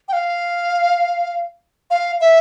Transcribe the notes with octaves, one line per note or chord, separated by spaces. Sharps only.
G5
F5
F5
E5